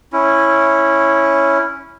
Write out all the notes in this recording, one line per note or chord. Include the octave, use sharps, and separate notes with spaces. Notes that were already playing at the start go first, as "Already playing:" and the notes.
C#4 E4